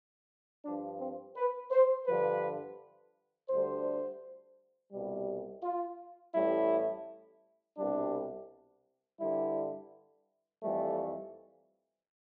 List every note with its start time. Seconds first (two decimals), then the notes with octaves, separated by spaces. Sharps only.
0.65 G2 F3 D4
1.00 C4
1.37 B4
1.71 C5
2.07 G2 D3 F3 B4
3.50 D2 D3 G3 C5
4.92 C2 B2 G3
5.63 F4
6.35 A1 A2 G3 E4
7.78 C2 B2 G3 D4
9.21 G2 D3 G3 E4
10.63 F2 E3 G3 A3